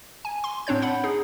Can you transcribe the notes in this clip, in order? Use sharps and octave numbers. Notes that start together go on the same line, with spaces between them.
G#5
C6
A2 C4 D4 C#5 G6
F#5 B5
D#4 G#4